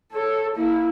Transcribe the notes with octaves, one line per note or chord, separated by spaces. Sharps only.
A4 C#5
A#3 E4